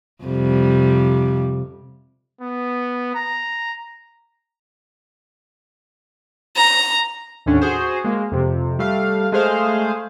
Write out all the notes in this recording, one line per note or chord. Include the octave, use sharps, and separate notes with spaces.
F2 C3 G3
B3
A#5
A#5
D#2 A2 D3 C#4 D4
F#4 G#4 C5
G#3 A#3
F2 C3
G3 A3 F5
G#3 A3 G#4 C5 F5